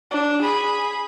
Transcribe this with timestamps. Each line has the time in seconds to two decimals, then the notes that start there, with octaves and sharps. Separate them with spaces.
0.11 D4
0.41 G#4 B5